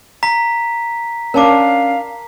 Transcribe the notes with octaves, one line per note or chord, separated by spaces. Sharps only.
A#5 B6
C#4 D4 A#4 F5 A5 D6